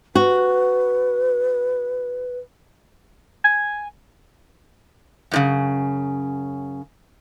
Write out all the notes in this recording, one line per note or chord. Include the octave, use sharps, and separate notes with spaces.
F#4 B4
G#5
F#2 A2 C#3